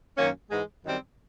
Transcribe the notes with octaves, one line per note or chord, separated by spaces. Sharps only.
F#2 D#3 F#3 A#3 C#4
G#2 E3 G#3
F#2 D#3 G3 C4